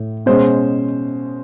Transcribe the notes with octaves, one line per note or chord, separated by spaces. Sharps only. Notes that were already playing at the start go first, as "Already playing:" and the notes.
Already playing: A2
B2 G#3 C#4 C5